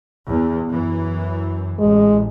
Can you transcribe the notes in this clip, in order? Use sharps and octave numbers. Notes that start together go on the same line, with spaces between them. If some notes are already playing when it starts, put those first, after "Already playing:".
E2
F#2 E3
A1 G#3